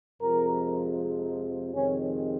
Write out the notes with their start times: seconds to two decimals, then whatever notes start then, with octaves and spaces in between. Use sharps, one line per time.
0.20 F2 C3 F3 G#3 A#4
1.73 F2 C3 D#3 G#3 C#4